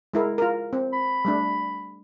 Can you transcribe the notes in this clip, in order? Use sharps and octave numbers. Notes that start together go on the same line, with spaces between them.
G#3 E4 A#4
F4 A#4
C4
B5
G3 A3 D4